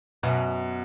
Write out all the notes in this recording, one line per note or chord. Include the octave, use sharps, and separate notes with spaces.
F#2 B2